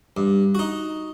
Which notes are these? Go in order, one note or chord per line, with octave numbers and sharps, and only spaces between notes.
G2
D#4 F#4